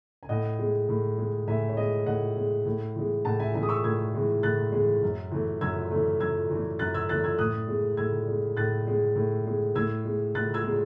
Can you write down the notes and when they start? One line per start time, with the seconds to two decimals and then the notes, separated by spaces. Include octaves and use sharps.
0.23 G#5
0.29 A2 D#5 F#5
0.59 G#3
0.89 A2
1.18 G#3
1.48 A2 E5 G#5
1.69 C#5
1.77 G#3 D#5
2.06 A2 D#5 F#5
2.36 G#3
2.65 A2
2.96 E3 G#3
3.25 A2 F#5 A5
3.40 E5 G#5
3.54 E3 G#3 E5 G#5
3.63 D#6
3.69 C#6 E6
3.84 A2 E6 G#6
4.14 E3 G#3
4.43 A2 F#6 A6
4.72 E3 G#3
5.03 F#2
5.31 E3 A3
5.61 F#2 E6 G#6
5.91 E3 A3
6.20 F#2 E6 G#6
6.50 E3 A3
6.79 F#2 F#6 A6
6.94 E6 G#6
7.09 E3 A3 F#6 A6
7.24 E6 G#6
7.38 A2 D#6 F#6
7.68 G#3
7.97 A2 E6 G#6
8.28 G#3
8.57 A2 F#6 A6
8.87 G#3
9.16 A2
9.46 G#3
9.75 A2 E6 G#6
10.05 G#3
10.35 A2 F#6 A6
10.54 E6 G#6
10.64 G#3